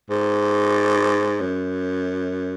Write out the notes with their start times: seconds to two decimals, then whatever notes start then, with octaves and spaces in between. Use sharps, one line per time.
0.10 G#2
1.41 F#2